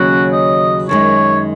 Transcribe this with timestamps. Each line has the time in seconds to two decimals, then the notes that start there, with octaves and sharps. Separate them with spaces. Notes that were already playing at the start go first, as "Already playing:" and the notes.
Already playing: D#2 C#3 F#3 C#4 F#4
0.33 D#5
0.89 F#2 D#3 G#3 C#5